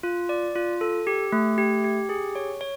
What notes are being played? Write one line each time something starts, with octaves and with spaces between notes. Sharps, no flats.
F4
D5
F4
A4
G4
A3
G4
G4
G#4
C#5
C#5